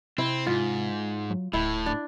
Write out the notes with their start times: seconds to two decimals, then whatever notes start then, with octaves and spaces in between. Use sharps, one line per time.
0.18 C3 C4 E4
0.47 G#2 F4
1.30 F#3
1.53 D1 A2 E4
1.86 D4